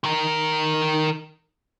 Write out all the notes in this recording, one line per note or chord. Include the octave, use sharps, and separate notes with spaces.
D#3 A#4